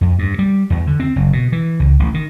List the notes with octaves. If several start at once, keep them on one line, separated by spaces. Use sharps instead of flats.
F2
G2
G3
E2
D3
C4
F#1
B2
E3
C#2
A1
D#3